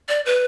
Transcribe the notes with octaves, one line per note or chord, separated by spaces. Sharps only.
D5
B4